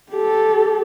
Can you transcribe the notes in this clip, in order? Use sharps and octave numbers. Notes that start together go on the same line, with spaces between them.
G4 A4